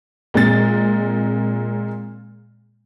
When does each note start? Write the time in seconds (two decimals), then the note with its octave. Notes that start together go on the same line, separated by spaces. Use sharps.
0.34 A#2 G#3 C4 A6